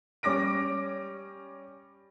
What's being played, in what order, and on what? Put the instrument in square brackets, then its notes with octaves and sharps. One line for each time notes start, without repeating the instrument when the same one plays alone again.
[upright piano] G3 C#4 D6 A#6 D7